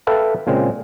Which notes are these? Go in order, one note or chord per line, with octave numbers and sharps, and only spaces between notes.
A4 B4 E5 F5 G5
A#2 C#3 G#3 C4